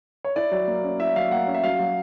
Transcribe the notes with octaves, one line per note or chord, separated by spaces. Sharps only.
C#5
E4 D5
F#3
A#3
C#4
E4 E5
F#3 F5
A#3 F#5
C#4
E5
F#3 F5
F#3